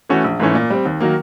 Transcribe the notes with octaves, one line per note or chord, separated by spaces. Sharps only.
E3 A3 C#4 F#4
A#1
G#2 E3 A3 C#4
A#2
G3 C4
D#2
D#3 F#3 A#3